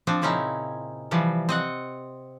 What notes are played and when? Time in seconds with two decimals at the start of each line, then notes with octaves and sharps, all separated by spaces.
0.07 F3 C4 D4
0.22 A#2 C#3 C4 C#4 D#4 E4
1.11 C3 E3 F3 G3
1.49 C4 D#5 F#5